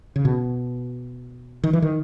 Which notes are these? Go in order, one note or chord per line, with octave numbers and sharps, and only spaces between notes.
C#3
B2
D#3
E3
D#3